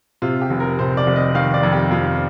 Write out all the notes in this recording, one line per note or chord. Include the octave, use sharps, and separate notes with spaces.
C3 F4
G4
F1
A#4
C3 C5
D5
F1
D#5
D#3 F5
D5
F2
G4
F2 F4